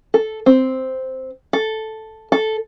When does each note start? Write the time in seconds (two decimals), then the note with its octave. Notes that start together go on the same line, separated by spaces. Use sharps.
0.14 A4
0.46 C4
1.53 A4
2.32 A4